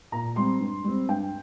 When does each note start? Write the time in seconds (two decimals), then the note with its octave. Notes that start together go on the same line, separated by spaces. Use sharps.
0.12 A#2 A#5
0.36 G3 C4 C6
0.60 G2
0.84 G3 C4
1.09 G2 G5